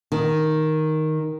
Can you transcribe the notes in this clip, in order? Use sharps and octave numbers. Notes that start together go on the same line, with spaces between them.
D#3